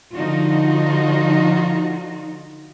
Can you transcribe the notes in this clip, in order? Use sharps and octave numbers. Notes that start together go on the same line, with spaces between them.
D3 F3 D#4 F4 F#4